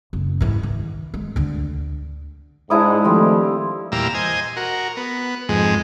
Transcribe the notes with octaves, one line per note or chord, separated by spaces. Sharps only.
F#1
G#2 E3
D#3
G#3
D2 D3
G#2 D4 E4 D#6
D#3 F3 G3 A3 C4
E2 A#2 G3 F5 A#5 E6
C5 D#5 G#5
F#4 A#4
B3
F2 G#2 G#3